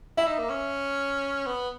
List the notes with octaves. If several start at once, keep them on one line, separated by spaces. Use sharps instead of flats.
E4 E5
D#4
A#3
C#4
B3